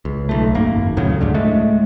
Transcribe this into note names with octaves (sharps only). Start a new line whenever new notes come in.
C#2
B1 A3
G#1 F#2 A#3
D2 A2 C#3 F#3
D2 G#2 D3
A2 G#3 A3